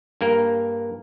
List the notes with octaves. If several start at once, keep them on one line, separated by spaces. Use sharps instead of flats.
G2 A#3 A#4